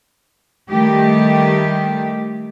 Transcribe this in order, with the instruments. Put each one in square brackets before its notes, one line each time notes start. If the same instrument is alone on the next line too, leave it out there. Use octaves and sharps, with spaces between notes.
[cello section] D#3 G3 A3 G4